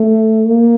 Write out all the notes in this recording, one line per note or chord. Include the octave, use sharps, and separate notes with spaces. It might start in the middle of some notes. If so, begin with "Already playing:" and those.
Already playing: A3
A#3